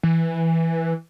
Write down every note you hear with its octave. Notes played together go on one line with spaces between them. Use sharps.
E3